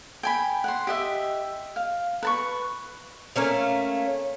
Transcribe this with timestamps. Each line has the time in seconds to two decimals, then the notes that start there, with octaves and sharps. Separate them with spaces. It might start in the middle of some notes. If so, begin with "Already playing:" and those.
0.23 G5 G#5 B5
0.64 F#5 C6
0.87 G4 D#5 E5
1.76 F5
2.23 B4 A5 C#6
3.36 A3 A#3 C#4 F5